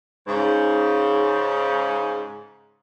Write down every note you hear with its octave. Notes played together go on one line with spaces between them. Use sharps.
G#2 C#3